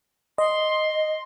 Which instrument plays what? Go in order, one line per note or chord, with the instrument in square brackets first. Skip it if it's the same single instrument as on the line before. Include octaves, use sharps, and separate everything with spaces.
[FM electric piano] D#5 [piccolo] C6